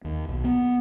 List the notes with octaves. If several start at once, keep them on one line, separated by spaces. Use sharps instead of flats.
D#2
B1
B3